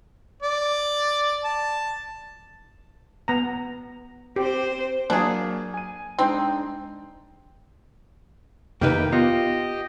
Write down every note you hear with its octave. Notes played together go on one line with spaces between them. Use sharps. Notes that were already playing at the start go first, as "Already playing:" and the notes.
D5
A5
B3 A#5
C4 G4 C5
F#3 A#3 D4 G#4
G#5 D#7
G#3 C4 D4 D#4
F2 C3 D#3 A#3 D#4 B4 G5
B3 F4 G4 D#5 C7